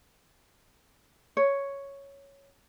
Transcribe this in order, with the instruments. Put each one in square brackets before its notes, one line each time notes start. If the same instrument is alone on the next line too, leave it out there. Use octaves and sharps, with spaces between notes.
[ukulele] C#5